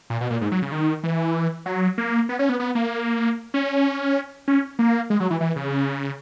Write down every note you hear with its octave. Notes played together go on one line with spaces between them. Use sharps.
A#2
B2
A#2
G#2
F#3
C#3
D#3
E3
F#3
A#3
B3
C#4
B3
B3
A#3
C#4
C#4
A#3
G#3
F#3
E3
E3
C#3